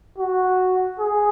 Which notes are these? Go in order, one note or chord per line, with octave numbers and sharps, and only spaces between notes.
F#4
G#4